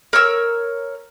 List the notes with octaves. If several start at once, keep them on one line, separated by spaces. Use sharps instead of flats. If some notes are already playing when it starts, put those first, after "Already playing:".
A#4 C#5 E6